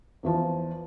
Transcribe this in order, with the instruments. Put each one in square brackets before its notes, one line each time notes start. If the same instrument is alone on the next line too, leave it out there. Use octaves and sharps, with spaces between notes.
[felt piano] E2 E3 F3